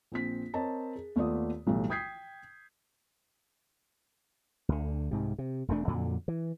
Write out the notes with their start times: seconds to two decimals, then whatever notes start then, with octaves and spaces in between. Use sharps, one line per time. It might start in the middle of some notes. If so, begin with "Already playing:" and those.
0.12 A#1 C4 B6
0.54 C4 A#4 C#5 D#5 A5 A#5
0.96 G#4
1.16 D#2 A3 B3 F4 D5 D#6
1.67 B1 A2 E3 G3 A3
1.90 G5 D#6 G6 G#6 B6 C7
4.69 D2 D3
5.11 C2 G#2 C3
5.38 C3
5.68 E1 E2 A3 D4
5.88 F2 A#2 D3 F#3
6.28 E3